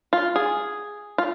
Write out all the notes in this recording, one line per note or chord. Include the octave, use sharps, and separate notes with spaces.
F4
G#4
F4